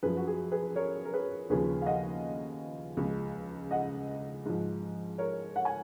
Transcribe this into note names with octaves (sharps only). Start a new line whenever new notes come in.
F#2 F3 G#4 B4
F#4
G#4
G#4 B4
A#4 C#5
A#4
G#4 B4
D#2 C#3 F3 G#4 B4
F5
D#5 F#5
C#2 C#3 F3
D#5 F#5
G#2 F3
A#4 C#5
F#5
G#5